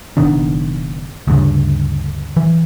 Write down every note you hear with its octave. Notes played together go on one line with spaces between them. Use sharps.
F#1 B2 D#3 D4
D2 G2 C#3
E3